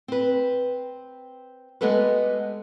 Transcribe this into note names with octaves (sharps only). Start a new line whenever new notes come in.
C4 B4
G#3 B3 G4 A4 B4